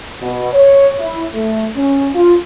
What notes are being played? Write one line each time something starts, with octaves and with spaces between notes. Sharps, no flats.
B2
C#5
E4
A3
C#4
F4